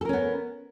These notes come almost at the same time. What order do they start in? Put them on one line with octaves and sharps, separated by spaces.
A4 A#4 C#4 B3